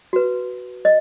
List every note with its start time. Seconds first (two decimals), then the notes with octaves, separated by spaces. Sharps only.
0.13 F#4 B4
0.85 D#5